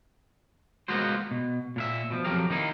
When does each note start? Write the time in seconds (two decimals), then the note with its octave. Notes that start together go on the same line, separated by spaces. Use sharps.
0.88 G#3 A#3 B3 F4 F#4 C5
1.31 B2
1.76 A#2 A#4 E5
2.10 B2 F3
2.24 F2 F3 F#3 G4 A#4 F5
2.50 D#3 A#3 D#4 E4